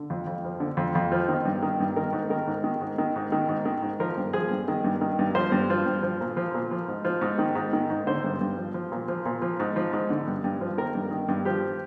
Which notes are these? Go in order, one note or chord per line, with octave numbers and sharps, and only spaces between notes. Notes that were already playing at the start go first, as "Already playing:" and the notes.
Already playing: D3
F2
F2
F3
D3
F2
F2
F3
D#3
G2
D#3
G2
D#3 A#4
G#2
D#3 A#4
G#2
D#3
G#2
D#3
G#2
D#3
G#2
D#3
G#2
F3 A#4
G2
F3 G#4
G2
D#3
G2
D#3
G2
F3 C5
G2
F3
G2
F3
A#2
F3
A#2
F3
G#2
F3
G#2
D#3
G#2
D#3
G#2
D3 C5
G2
G2
F3
F3
A#2
F3
A#2
F3
G#2
F3
G#2
D3
G2
G2
F3
D#3 A#4
G2
D#3
G2
F3 G4